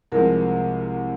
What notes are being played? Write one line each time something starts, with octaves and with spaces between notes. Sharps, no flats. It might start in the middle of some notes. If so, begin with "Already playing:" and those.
C2 C3 F3 G#3 A#4